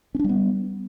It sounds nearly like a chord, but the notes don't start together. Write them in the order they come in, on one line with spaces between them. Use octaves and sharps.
C#4 D4 G3 B3